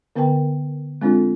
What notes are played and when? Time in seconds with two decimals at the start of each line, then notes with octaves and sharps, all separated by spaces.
0.16 D3 B3 A#4 B4 G5 A5
1.01 G#3 C4 D4 F4 A4